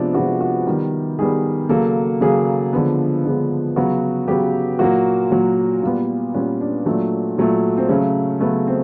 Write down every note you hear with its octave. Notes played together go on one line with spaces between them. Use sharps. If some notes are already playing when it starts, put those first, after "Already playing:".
Already playing: C3 F3 G#3 B3 D4
C3 F3 G#3 B3 F#4
F#4
D#3 G3 B3
D#3 G3 B3 G#4
C#3 F#3 A#3 A4
C#3 F#3 A#3 G#4
D3 F3 G#3 B3
D3 F3 G#3 B3
C#3 F#3 B3 F#4
C#3 F#3 B3 G4
A#2 F#3 A#3 F#4
A#2 F#3 A#3
A#2 G3 B3 F4
A#2 G3 B3 C#4
D4
A#2 F#3 A3
A#2 F#3 A3
C4
C#3 F#3 A3 C#4
C#3 F#3 A3 B3
C4